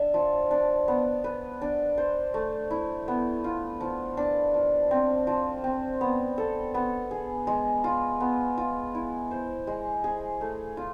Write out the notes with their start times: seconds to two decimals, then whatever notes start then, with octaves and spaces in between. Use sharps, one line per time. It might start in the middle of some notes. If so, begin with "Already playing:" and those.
Already playing: D4 E5
0.14 F3
0.51 D4
0.88 B3
1.24 B4
1.61 D4
1.98 C5
2.34 A3
2.70 E4
3.08 B3
3.44 F4
3.81 F3
4.17 D4
4.54 F3
4.91 C4
5.27 F3
5.64 C4
6.01 B3
6.38 A4
6.74 B3
7.11 G#4
7.47 G#3
7.84 F4
8.20 B3
8.57 F4
8.95 E4
9.31 C5
9.67 G#3
10.04 G#4
10.41 A3
10.77 F4